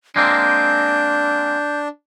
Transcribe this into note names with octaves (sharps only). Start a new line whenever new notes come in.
G#3 A#3 C4 D4 G6